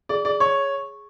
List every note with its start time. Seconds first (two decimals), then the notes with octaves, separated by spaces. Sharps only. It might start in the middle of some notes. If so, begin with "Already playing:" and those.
0.09 G#4 D5
0.25 G#4 D5
0.40 C#5 C#6